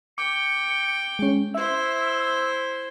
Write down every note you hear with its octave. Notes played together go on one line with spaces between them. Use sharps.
G5 D6 C#7
G#3 C#4
E4 C5 E5 E6